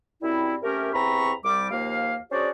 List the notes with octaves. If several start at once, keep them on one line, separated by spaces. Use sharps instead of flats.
F#2 G3 C4 E4
C3 A3 C#4 G4 A#4
E2 C3 C4 A#5 B5 C#6
C2 G3 D6
D#2 F3 A#3 F5
C#4 D4 F#4 G#4 C5 D5